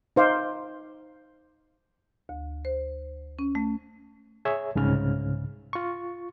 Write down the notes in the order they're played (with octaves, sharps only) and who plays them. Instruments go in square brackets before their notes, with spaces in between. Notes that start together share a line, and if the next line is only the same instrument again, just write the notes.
[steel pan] D#4 C5 F5 D6
[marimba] D2
C5
C#4
A3
[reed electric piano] G#4 C#5 E5
C2 G#2 C#3 F6
F4 C#6